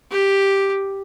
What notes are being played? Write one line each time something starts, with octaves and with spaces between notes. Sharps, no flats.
G4